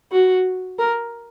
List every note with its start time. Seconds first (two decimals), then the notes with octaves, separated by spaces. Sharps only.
0.12 F#4
0.79 A#4